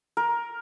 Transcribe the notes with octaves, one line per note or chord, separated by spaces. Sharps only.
A#4